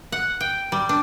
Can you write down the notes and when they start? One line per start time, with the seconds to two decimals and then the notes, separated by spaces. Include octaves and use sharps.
0.12 F#5
0.41 G5
0.72 G3
0.89 D4